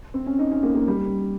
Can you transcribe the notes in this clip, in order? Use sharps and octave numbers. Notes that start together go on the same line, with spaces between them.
C4
C#4
D#4
C#4
A#3
A#3
G3